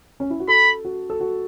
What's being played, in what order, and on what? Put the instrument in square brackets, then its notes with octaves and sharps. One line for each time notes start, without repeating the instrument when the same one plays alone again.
[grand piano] C#4
E4
F#4
[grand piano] A4 [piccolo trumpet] B5
[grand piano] F#4
A4
F#4